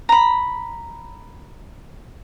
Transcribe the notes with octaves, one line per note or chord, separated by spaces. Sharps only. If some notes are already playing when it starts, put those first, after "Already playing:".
A#5 B5